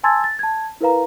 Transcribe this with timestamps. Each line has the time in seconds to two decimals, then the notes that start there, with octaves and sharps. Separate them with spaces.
0.04 G#5 A5 C6 E6 G#6 A6
0.24 A6
0.39 A5 G#6
0.81 E4 A#4 B4 F5 A#5